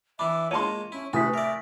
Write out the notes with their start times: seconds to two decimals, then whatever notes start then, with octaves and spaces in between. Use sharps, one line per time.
0.19 E3 D4 E5 B5 D6
0.51 G#3 A#3 F4 C#5 A5 C6 D#7
0.92 C#4 E4
1.13 A2 C3 F#4 B4 G#5 D#6 B6
1.34 A#4 D5 E5